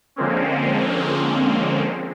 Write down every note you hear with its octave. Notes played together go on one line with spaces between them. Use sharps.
D3 F3 G#3 A#3 C4 C#4